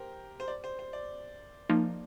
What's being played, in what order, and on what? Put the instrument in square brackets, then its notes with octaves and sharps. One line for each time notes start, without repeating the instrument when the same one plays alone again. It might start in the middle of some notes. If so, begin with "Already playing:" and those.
Already playing: [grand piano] G4 A#4 C5
C5
D5
C5
C5
D5
[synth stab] F3 A#3 D#4